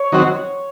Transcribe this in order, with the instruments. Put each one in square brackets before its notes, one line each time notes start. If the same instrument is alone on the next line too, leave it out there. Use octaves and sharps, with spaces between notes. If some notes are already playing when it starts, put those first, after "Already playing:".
Already playing: [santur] C#5
[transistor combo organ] D#3 F#3 C4 F#4